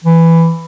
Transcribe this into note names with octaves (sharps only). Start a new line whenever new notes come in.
E3